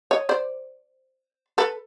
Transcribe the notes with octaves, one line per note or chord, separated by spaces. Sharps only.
C#5 D#5
C5 D5
A4 B4